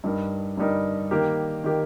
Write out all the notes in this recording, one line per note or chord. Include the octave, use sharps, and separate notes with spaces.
G2 G3 D#4 A#4
G2 G3 D#4 A#4
D#3 A#3 G4 A#4
D#3 A#3 G4 A#4